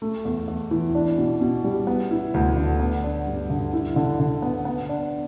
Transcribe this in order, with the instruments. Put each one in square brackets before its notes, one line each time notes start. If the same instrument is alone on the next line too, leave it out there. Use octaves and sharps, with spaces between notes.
[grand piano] A3
E2
E2
E3
D4
B2
B2
G3
B3
E4
D2
D3
B3
D4
G2
D3
E4
D3
D3
B3
B3
D4